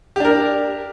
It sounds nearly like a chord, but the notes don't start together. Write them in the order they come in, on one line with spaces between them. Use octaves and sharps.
G4 D4 A#4